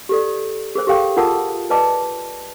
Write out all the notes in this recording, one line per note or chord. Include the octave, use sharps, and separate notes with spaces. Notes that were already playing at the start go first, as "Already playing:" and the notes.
G4 A4 D5
G#4 A#4 C5
G4 A4 F5 G5
F4 G#4 A#4 F#5 A5 D#6
B4 D5 D#5 A5 D6